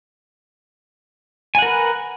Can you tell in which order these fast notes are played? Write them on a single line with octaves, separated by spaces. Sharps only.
G#5 F#5 A#4 B4